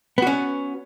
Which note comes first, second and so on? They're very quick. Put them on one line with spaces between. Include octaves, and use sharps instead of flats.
B3 F#4 C#4